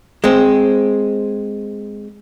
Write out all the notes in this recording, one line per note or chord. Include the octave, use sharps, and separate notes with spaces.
G#3 C4